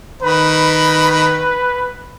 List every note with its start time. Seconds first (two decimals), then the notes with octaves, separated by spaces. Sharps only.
0.22 D#3 B4 B5